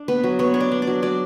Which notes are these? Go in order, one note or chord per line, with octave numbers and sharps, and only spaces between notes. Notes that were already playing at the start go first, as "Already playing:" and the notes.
Already playing: D4
B3 B4
F#3
B3 C#5
D4 C#5
D5
D4
D5
F#3
F#3 D5